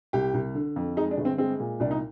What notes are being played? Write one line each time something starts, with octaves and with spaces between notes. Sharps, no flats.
C2 G4
C2
D3
F2
G#3 D#4
D4
G1
C4
G#3 C4
A#2
C2 D4
D#4